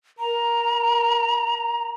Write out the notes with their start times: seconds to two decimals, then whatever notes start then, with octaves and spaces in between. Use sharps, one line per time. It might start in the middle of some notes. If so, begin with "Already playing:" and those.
0.19 A#4 A#5